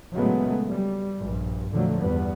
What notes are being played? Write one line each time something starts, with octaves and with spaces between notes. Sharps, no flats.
A#2 C#3 F#3 G#3 A3 B3
G3
A#1 G2
F2 A#2 D3 F3 F#3 A3
E2 G2 G3 B3